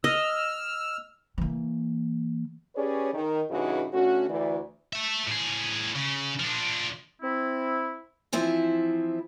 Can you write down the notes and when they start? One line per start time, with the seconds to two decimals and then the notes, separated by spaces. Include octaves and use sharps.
0.04 D#5 E6 F6
1.38 E3 A#3
2.76 C#4 G4 G#4 B4 C#5 D5
3.14 D#3
3.50 G2 C#3 E3 D#4 F#4 G#4
3.93 D3 A3 C#4 F#4
4.29 D2 E3 D5
4.93 A4 E5
5.27 A2 G#4
5.96 C#3
6.40 F3 D4
7.22 C4 E4
8.33 E3 F3 C4 E4